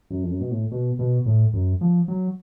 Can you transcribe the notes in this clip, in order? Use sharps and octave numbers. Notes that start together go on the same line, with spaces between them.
F#2
F2
F#2
B2
A2
B2
B2
A2
F#2
F3
F#3